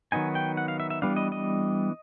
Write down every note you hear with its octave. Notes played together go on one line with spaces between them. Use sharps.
D#3 F#3 B3 D#4 G#5
G5
F#5
F5
E5
E5
E3 G3 B3 D4 F5
D#5
D#5